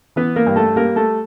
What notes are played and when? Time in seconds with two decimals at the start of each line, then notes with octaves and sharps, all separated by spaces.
0.16 E3 B3 B4
0.36 A#3 A#4
0.47 G2
0.56 A3 A4
0.76 G3 A#3 A#4
0.96 A3 A4